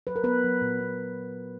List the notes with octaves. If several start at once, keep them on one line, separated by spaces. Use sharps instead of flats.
F#3 B4
A#4
F#3 B3 B4
F#3
A#2
B3